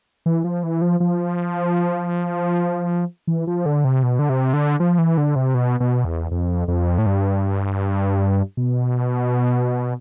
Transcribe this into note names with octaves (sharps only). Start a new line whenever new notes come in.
E3
F3
E3
F3
F3
E3
F3
D3
C3
B2
D3
C3
D3
F3
E3
D3
C3
B2
B2
E2
F2
F2
A2
G2
B2